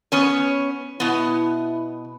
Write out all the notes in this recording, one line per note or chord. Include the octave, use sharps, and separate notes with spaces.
B3 C#4 C#5
B2 B3 E4